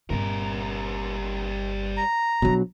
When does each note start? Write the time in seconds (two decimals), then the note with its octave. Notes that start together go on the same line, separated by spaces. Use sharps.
0.10 G1 A#2 G3 A#4
1.97 A#5
2.42 B2 F3 F#3 D4